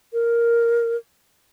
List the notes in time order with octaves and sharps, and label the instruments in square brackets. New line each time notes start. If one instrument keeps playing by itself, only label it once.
[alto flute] A#4